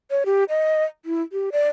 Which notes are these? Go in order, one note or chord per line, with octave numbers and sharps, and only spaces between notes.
C#5
G4
D#5
E4
G4
D5